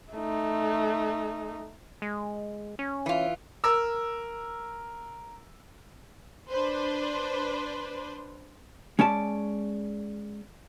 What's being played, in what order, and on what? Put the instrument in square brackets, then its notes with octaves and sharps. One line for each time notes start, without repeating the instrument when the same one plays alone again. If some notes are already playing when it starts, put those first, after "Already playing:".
[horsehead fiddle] A3 D#4
[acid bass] G#3
C#4
[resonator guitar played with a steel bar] E3 F4
[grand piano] A#4 E6
[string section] D4 B4 C5
[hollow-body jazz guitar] G#3 C#4 D5 A5